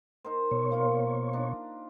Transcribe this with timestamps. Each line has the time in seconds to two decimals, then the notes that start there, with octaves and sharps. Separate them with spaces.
0.24 D#4 A#4 C5
0.51 B2 C#5
0.70 F3 A#3 F4
1.33 D4 D#4